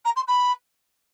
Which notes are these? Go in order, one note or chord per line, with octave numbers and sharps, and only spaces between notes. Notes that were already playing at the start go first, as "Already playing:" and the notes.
A#5
C6
B5